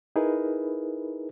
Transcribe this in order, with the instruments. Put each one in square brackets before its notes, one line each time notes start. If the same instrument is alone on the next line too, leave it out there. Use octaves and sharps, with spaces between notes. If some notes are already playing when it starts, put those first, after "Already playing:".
[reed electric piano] D#4 E4 G#4 A#4 B4